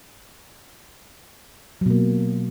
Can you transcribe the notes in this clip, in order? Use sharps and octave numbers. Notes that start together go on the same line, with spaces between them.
B2 F#3 A#3